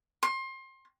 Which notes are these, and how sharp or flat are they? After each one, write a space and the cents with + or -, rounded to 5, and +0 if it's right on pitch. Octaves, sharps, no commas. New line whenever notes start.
C6 +30